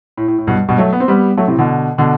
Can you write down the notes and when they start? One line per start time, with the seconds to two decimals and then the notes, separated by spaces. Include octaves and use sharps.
0.17 A2
0.28 A2
0.38 A2
0.47 G2 B2
0.68 G2 B2
0.78 F#3 A3
0.93 B3
1.00 C4
1.08 G3 B3
1.37 F#3 A3
1.48 A2 C3
1.59 B2 D3
1.98 B2 D3